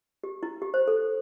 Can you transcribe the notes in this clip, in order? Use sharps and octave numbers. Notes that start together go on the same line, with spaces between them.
G4
E4
G4
C5
A4